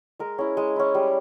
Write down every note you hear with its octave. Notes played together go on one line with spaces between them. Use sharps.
G#3 A#4
C#4 E4 G#4
G#3
C#4 E4
G3